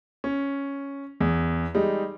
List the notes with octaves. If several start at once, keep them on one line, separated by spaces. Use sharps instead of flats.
C#4
E2
G3 G#3 D#4